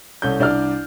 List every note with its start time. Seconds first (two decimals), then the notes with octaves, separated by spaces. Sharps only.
0.22 C2 C#4 A4 G6
0.39 C2 D4 D5 F6